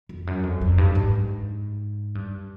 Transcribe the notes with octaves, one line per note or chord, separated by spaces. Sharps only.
F2
F#2
F2
F2
G2
G#2
G2